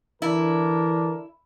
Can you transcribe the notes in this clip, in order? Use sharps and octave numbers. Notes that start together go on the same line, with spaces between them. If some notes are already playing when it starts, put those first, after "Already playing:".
D3 E3 D4 E4 A#4